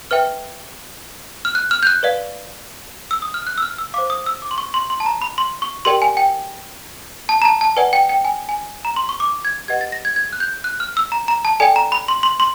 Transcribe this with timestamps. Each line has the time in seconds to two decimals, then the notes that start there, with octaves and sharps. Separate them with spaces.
0.11 B4 E5 G5 F6
1.45 F6
1.55 F#6
1.71 F6
1.83 G6
1.87 F#6
2.03 B4 D5 F5
3.11 E6
3.22 D#6
3.34 F6
3.47 F#6
3.58 E6
3.62 F6
3.78 E6
3.94 C5 F5 D6
4.10 D#6
4.26 E6
4.42 D6
4.51 C6
4.58 C#6
4.74 C6
4.90 C6
5.00 A5
5.06 A#5
5.22 B5
5.38 C6
5.62 C#6
5.85 G4 A#4 D5 G5 C6
6.02 G#5
6.17 G5
7.29 A5
7.42 A#5
7.45 A5
7.61 A5
7.77 B4 D5 F#5 G#5
7.93 G5
8.09 G5
8.25 G#5
8.49 G#5
8.85 A#5
8.96 C6
9.09 C#6
9.20 D6
9.45 G#6
9.68 G4 B4 D#5 F#5 G#6
9.81 A6
9.92 A#6
10.05 G#6
10.16 G#6
10.33 F#6
10.40 G6
10.64 F#6
10.80 F6
10.97 E6
11.12 A#5
11.28 A#5
11.45 A5
11.60 A4 D5 G5 G#5
11.76 A#5
11.92 B5
12.08 C6
12.23 C6
12.40 C6